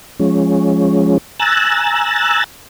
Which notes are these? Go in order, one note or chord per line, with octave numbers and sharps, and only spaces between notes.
F3 G#3 C#4
G#5 A#5 E6 F#6 A6